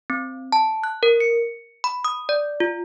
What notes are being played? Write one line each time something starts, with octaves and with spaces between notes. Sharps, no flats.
C4
A5
F#6
A#4
C#7
B5
D#6
D5
F4